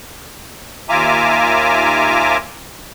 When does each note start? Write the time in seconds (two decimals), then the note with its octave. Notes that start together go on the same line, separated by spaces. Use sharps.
0.89 D#2 F4 E5 G#5 A#5 D6